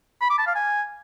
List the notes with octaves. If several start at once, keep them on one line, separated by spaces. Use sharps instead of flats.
B5
D6
A5
F5
G#5